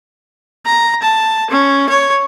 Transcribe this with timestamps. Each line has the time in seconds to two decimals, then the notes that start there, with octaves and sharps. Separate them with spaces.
0.66 A#5
1.02 A5
1.50 C#4
1.89 C#5